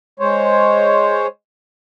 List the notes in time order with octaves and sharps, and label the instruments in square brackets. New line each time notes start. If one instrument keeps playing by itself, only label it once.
[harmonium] G#3 C5 C#5